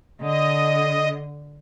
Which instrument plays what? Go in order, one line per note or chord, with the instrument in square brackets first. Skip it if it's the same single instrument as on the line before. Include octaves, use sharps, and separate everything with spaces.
[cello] D3 [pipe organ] D#5